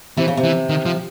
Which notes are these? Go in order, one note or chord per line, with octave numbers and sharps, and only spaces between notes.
C3 E3
C#3
C3
E3
D#3
F3